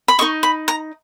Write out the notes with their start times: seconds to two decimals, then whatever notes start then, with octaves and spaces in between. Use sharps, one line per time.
0.08 B5
0.19 D#4 A#4 D#5 C#6
0.43 B5
0.68 A#5